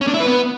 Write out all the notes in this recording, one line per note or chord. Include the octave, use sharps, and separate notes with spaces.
C#4
D4
E4
B4
B3